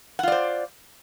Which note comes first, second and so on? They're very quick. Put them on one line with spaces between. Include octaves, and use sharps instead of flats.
F#5 F4 D5 C5